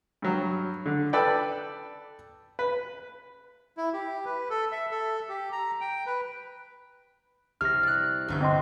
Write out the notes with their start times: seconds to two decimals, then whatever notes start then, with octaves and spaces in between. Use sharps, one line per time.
0.22 G2 F#3
0.86 D3
1.13 A4 B4 D5 G5
2.59 B4
3.77 E4
3.94 G4
4.25 B4
4.50 A4
4.72 E5
4.91 A4
5.29 G4
5.52 A#5
5.81 G5
6.06 B4
7.61 C2 F6 A#6
7.83 D5 F#6
8.28 G1 C2 G6
8.41 C4 D#5 C6